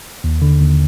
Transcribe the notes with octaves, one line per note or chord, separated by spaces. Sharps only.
D#2
D3
D#2